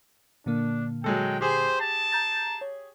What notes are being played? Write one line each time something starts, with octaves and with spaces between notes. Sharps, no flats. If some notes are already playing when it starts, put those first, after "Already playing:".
A#2 D3 A#3 D4
F#3 G#3 A4 G5
G4 G#4 C5
A5
A#5 G6 A6
C#5